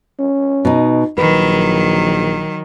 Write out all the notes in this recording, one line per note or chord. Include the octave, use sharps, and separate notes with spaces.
C#4
B2 D#4
A#1 D#3 F#3 B4